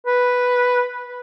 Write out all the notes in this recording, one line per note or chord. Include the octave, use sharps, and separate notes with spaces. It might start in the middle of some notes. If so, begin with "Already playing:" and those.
B4